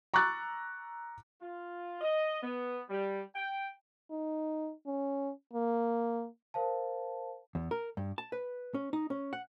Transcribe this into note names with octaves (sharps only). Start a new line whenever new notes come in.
A#5 C#6 D6 E6 F#6 A6
F4
D#5
B3
G3
G5
D#4
C#4
A#3
A#4 C5 F5 A5
E2
A#4
G2
A5
B4
C#4
D#4
C#4
F#5